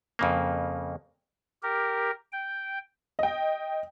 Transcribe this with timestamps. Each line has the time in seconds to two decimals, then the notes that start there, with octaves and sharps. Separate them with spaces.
0.19 F2 C#3 A#3
1.63 G4 A#4
2.32 G5
3.19 D#5 G5